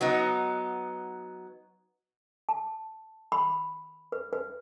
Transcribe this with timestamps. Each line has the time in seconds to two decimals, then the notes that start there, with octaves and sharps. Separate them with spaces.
0.01 F#3 B3 D#4
2.49 A5
3.32 B5
4.12 B4
4.33 B4